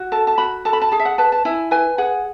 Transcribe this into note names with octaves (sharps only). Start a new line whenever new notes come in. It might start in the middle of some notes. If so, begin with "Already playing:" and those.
Already playing: F#4
A4 A5
A5
F#4 B5
A4 A5
B5
A5
G#4 A5
E5
F#5
B4 A5
A5
E4 G#5
B4 G#5
G#4 F#5